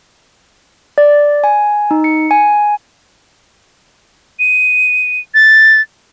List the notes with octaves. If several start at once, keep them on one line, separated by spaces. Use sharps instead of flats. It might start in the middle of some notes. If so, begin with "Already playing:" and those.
D5
G#5
D#4
C#7
G#5
D#7
A6